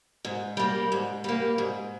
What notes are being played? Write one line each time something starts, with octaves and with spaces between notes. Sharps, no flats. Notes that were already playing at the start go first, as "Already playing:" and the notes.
G#2
G3 A#3
G#2
G3 A#3
G#2